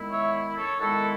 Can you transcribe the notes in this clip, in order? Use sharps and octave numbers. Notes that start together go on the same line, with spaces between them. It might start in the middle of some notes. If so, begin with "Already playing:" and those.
Already playing: D#3 G#3 B3 E4
C#5 E5
A4 C#5
D#3 G#3 B3 E4 F#4 A4